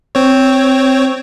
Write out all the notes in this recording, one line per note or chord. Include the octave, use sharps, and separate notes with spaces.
C4 C#5